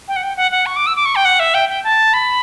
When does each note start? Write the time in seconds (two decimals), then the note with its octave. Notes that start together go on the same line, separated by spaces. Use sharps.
0.08 G5
0.16 F#5
0.23 G5
0.37 F#5
0.52 F#5
0.66 C#6
0.76 D6
0.87 E6
0.96 D6
1.05 C#6
1.16 G5
1.25 F#5
1.40 E5
1.54 G5
1.69 G5
1.84 A5
2.14 B5